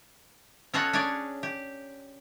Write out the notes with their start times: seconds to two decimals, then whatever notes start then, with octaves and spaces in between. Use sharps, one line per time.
0.74 C#4 F4 A4 C#5 D#5 F#5
0.93 C#4 D4 G#4 C#5 D5
1.43 G4